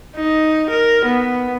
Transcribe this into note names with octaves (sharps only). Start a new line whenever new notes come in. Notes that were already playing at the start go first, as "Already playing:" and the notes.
D#4
A#4
B3